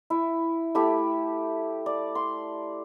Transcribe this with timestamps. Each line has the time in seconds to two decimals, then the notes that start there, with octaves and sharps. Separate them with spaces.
0.10 E4
0.75 A3 E4 G4 E5
1.86 D5
2.15 C6